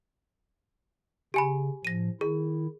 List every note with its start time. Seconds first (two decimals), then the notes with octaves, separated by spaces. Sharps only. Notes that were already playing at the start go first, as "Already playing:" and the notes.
1.34 C#3 G4 G#5 B5
1.85 A2 F3 A#6 D#7
2.21 D#3 E4 G#4